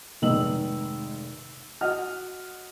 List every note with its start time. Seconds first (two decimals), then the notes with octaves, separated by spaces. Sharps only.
0.22 F1 G#2 D#3 D#5 E6 F#7
1.81 F#4 D#5 F#5 F6